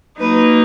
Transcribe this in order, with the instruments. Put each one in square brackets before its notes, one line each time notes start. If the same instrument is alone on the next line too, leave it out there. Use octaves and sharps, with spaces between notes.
[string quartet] F#3 A#3 D#4 B4